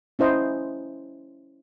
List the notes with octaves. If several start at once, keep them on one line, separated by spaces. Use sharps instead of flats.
C#4 E4 C5 D#5